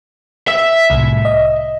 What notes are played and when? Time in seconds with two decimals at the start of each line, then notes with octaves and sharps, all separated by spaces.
0.48 E5 E6
0.90 C2 A2
1.25 D#5